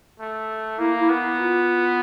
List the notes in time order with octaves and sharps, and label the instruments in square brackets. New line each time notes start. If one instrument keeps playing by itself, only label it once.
[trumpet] A3
[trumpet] A#3 [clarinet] E4
[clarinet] E4
[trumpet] B3
[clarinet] F4